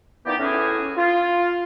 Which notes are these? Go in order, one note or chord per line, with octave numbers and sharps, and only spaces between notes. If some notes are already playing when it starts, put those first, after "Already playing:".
A#2 E3 B3 D#4 G4
A2 E3 C#4 E4 F#4 G#4
F4